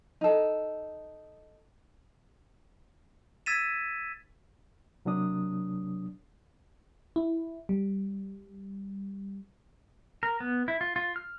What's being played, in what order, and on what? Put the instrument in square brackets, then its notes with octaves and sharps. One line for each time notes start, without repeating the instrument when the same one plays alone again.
[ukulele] D#4 A4
[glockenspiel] E6 G#6 A6 B6 D#7 E7
[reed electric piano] C3 F#3 A#3 D4 D#6
[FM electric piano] E4
G3
[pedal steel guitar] A#4
B3
E4
F4
F4
F6